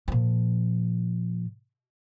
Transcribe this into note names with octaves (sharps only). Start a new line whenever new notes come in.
A#2 F3